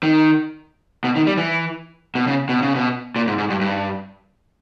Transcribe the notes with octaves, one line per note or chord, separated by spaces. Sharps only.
D#3
B2
D#3
G3
E3
B2
C#3
B2
C#3
B2
A#2
G#2
G#2
G2
G2